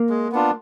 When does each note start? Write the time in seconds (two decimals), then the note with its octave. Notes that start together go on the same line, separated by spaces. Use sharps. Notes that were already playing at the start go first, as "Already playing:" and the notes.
Already playing: A#3
0.10 G#3
0.32 B3 D4 F4